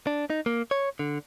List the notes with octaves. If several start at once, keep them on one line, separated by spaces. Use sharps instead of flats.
D4
D#4
A#3
C#5
D3